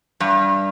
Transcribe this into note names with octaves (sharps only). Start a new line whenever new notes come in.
G2